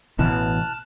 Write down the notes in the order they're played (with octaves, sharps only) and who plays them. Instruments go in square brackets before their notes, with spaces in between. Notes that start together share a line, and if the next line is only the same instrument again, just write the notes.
[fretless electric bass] A1 B2 E3 [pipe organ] A5 F6 F#6